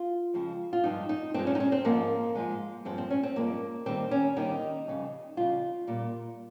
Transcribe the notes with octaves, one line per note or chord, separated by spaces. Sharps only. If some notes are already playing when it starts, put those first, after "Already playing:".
Already playing: F4
F2 C#3 F3 G#3
F4
G2 F3 G#3 D#4
D#4
G2 F3 G#3 C4
C#4
D#4
C#4
C4
G#2 F3 G#3 A#3
G#2 F3 G#3
G2 F3 G#3 C4
C4
C#4
C4
G2 F3 G#3 A#3
D#2 D#3 G3 C4
C#4
D#2 D#3 G3 D#4
F2 C#3 G3
F2 C#3 G3 F4
A#2 G3